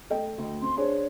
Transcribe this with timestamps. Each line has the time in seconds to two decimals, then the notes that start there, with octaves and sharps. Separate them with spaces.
0.10 A3 D#5 G5
0.38 D2
0.62 C4 C6
0.78 D4 G#4 C5 C#5